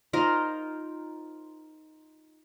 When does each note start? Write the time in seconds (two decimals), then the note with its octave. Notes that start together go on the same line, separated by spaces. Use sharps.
0.13 D#4 F4 A#4 C5